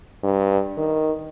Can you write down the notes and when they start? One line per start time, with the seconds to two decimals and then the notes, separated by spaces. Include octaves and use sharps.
0.23 G2
0.78 D#3